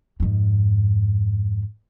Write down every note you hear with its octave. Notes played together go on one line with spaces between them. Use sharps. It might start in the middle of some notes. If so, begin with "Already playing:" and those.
F2 G#2